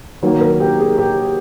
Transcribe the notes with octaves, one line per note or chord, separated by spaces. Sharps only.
D#3 F#3 A#3
A#4
G4
G#4
G4